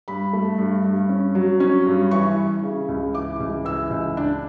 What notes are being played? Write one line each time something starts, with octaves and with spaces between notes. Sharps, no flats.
G2 B5
A3
G2
G2
C#4
F#3
C#4
G2
E3 C#6
E3
C#3
C#2
E3 D6
C#2
E3 E6
C#2
D4